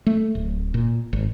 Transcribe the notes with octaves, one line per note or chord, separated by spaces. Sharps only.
A3
D1
A#2
G#1